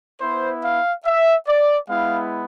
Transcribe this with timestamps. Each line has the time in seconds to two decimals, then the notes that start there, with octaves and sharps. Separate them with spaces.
0.20 B3 E4 C5
0.63 F5
1.05 E5
1.48 D5
1.89 G#3 B3 E4 F5